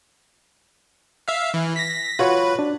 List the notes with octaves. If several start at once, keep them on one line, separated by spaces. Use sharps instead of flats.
E5 F5
E3
A#6 B6
F4 F#4 B4 C#5
D4